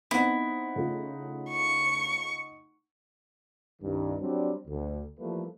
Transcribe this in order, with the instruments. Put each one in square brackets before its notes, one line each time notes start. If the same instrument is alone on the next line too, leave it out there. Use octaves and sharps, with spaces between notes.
[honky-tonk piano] B3 C4 [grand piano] D#4 F#5 [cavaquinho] E4
[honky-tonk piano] C#3 A3 F4
[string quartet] C#6
[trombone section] C2 G2 D#3
F#3 G3 C4 D4
D2
E3 F3 G3 A3 A#3 B4